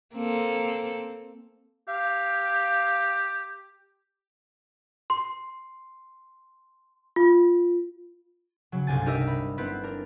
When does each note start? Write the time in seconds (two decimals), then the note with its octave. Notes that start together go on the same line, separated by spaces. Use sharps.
0.15 A#3 C4 A4
1.89 G4 F5
5.10 C6
7.16 F4
8.72 C#3 F#3
8.87 G1 C2 C3 G#5 A6
9.06 D#4 G4 A#4 D#5 E5
9.28 B5
9.58 B3 C4 E4 B4
9.83 D4 A#4